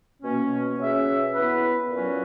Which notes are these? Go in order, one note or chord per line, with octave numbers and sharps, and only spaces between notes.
B2 A#3 C#4
F#3 C#4 G#4 B4 E5
B3 E4 B4
A#2 F#3 C#4 F#4